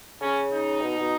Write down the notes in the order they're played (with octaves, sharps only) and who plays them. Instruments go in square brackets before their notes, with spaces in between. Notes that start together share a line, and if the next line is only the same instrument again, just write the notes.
[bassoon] C#3 [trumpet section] C#4
[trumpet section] D#4
[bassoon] B2
B2